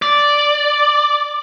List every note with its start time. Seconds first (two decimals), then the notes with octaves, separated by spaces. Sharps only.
0.02 D5